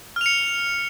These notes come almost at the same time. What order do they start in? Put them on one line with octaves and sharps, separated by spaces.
F6 F7 C#7